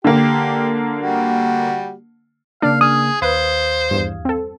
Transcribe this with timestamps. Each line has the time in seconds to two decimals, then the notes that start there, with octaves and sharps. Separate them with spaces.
0.04 D3 A#3 G4
1.00 G3 F#4
2.62 C#3 A#3 D4 D5 F5
2.81 G#4 D#6 F6
3.22 D#2 B4 C5 F5 G#6
3.91 E2 G2
4.25 C4 A4